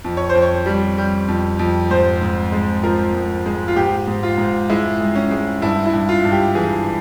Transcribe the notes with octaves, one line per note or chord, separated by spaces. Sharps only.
F2
C#5
C5
F2
C#5
G3
G3
F2
F2
G#2 C5
G#2
G#3
F3 A#4
G#2
G#3
F4
G#2 G4
G#2
F4
G#2
G#3 E4
G#3
C#4
G#3
G2 E4
E4
G2
F4
G2
G4
E3 G#4